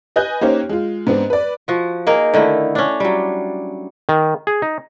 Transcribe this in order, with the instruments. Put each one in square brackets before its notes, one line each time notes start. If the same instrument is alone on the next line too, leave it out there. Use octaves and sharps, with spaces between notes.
[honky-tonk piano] B4 D#5 G#5 F#6 G6
A#3 C#4 D#4 G4 C5 C#5
G#3 F4
G#2 B3 C4 D4
B4 D5
[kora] F3 F#4
A#3 D#4 G#4 A#4
D3 D#3 A3 E4
C#4 D4
F#3 G3
[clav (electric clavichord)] D#3
G#4
D#4